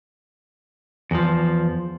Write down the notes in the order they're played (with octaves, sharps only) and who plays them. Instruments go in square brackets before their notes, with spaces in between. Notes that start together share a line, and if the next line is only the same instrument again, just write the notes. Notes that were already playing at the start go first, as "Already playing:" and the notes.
[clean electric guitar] E2 F3